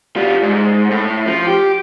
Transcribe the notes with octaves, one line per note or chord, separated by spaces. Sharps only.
G3 F4
G#2
A2
F3
G4